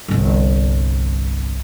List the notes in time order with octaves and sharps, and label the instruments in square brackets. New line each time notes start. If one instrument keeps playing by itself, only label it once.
[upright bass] G1 C2